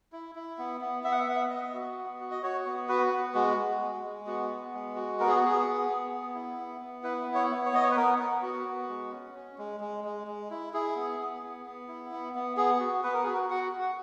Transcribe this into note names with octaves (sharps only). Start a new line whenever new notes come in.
E4
E4
B3
B3
B3 E5
F#5
E5
B3 F#5
E5
B3 D#5
F#4
B3
F#4
D#5
F#4 C#5
B3
F#4 B4
B3
G#3 F#4
G#3
G#3
G#3
B3 F#4
B3
G#3
F#4
B3 A#4
G#4
F#4
B3 G#4
B3
B3
B3
E4
B3
B3
E4 B4
B3
C#5
B3
C#5
B3 D#5
C#5
B4
B3 A#4
B3
B3 F#4
B3
G#3
C#4
C#4
G#3
G#3
G#3
G#3
E4
E4 G#4
B3
B3
B3
B3
E4
B3
B3
B3 G#4
F#4
B3 B4
A#4
F#4 G#4
A#4
F#4 F#5
F#4
F#5